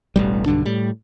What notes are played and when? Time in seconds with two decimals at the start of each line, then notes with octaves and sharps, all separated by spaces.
0.16 E1 A1 G3
0.46 B1 G2 D3 D4
0.65 A2 G3